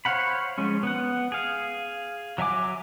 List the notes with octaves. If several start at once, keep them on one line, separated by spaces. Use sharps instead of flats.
C5 C#5 F5 F#5 B5
F3 G#3 C#4
B3 F#5
G#4 F5
F#3 E5 G#5 D6